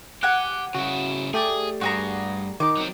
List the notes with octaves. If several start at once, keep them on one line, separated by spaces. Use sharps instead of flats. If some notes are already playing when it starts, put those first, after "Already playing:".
G4 F#5 G#5 F#6
C#3 E4 F#4
A3 G4 G#4 D5
G2 F#4 G#4 A#5
D#3 D#4 D6
F#3 C4